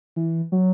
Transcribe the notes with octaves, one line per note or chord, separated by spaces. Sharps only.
E3
F#3